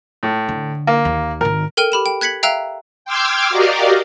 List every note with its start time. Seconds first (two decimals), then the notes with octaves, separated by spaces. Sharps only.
0.23 A2
0.48 D3
0.87 A#3
1.05 D#2
1.41 G#1 D#3 A#4
1.77 A4 A#4 G5 F6 D#7
1.92 G4 B5 E7
2.06 G5
2.21 F#6 G#6 B6 C#7 F#7
2.43 E5 F5 G5 A#5 E6 F#6
3.05 G5 C6 D6 E6 F6 G#6
3.50 F#4 G4 A#4 D5 D#5 F5